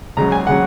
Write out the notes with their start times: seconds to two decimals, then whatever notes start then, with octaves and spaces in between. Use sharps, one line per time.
0.17 C#2 C#3 F#3 A#5
0.32 G#5
0.47 C#3 F#3 F#5